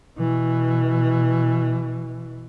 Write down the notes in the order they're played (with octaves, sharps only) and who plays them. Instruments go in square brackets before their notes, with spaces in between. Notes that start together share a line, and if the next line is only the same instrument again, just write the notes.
[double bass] B2 E3